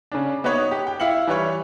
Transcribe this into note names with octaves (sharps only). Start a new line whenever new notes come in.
C#3 C#4 D4
B3 D#4 F#4 B4 C#5
G4
G5
E4 F5 C#7 F#7
E3 G3 B4 C#5